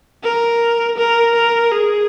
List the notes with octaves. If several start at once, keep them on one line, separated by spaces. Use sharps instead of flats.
A#4
A#4
A#4
G#4